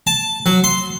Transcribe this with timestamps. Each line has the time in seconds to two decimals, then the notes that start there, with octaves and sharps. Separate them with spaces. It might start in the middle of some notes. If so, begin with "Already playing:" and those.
0.07 A5
0.46 F#3
0.64 C6